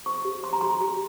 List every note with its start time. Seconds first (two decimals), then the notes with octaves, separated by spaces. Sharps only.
0.06 C5 C#6
0.25 G4
0.43 C5 C6
0.53 A#5
0.61 G4 C6
0.81 G4